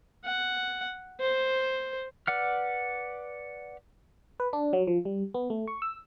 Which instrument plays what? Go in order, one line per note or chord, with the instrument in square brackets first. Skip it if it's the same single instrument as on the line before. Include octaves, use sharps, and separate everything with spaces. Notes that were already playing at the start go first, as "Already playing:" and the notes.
[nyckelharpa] F#5
C5
[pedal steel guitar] B4 D5 F#5 F6
[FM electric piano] B4
D4
F#3
F3
G3
B3
A3
C#6
E6